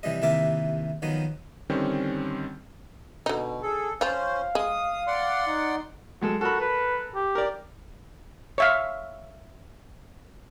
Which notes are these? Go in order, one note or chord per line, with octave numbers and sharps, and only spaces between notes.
C3 E3 G3 D#5
D#2 C3 E3 A#4 E5 D6
D#3 F3 F#3 B3 D#4
D3 D#3 G3 C4 C#4
B2 D3 D#4
G#4 A4
F3 C#4 F4 C5 F5
G#3 D#6
D5 F#5 C6
D#4
F#3 G#3 A4
F#4 A4 A#4 B5
B4
G4
A#4 D5
C#5 E5 F5